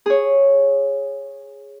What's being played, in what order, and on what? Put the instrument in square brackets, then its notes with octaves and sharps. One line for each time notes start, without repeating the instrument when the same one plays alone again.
[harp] G#4 C#5